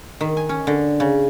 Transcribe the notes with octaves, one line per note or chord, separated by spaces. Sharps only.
D#3
G#5
C#4
D3
C#3